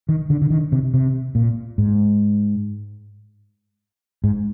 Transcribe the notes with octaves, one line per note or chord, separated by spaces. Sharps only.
D#3
D3
D3
D#3
C3
C3
A#2
G#2
G#2